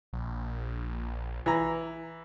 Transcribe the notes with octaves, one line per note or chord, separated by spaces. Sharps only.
A#1
E3 A#5